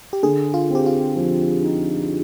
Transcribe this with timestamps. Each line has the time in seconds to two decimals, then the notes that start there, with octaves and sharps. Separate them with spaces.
0.13 G4
0.23 D3 G#4
0.54 F4
0.70 C4 G4
0.86 F4
1.16 F3
1.64 D#4